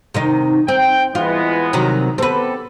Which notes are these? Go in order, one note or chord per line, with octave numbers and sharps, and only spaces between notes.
C3 D#3 D#4
C4 G5
E3 G#3 B3 F4
C3 D#3 F#3
B3 C4 G4 A4 B4